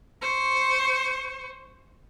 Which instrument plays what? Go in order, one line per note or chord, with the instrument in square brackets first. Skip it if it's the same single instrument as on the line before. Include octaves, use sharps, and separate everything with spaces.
[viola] C5 C#6